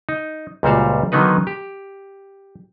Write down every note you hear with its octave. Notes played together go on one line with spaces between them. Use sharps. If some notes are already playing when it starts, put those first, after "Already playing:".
D#4
C#2 A#2 G3 F#4 C5 F5
D3 D#3 F#3 B3 D#4 B4
G4